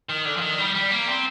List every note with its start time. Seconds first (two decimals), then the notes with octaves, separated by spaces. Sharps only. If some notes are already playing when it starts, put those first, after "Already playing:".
0.09 D#3
0.25 D3
0.37 F3
0.41 D#3
0.58 G3
0.74 G3
0.91 A#3
1.08 C4